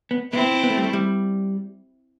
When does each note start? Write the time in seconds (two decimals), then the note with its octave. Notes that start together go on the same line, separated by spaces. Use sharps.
0.11 B3
0.33 B3 C4 E4
0.63 B3
0.70 A3
0.77 G3
0.84 A3
0.93 G3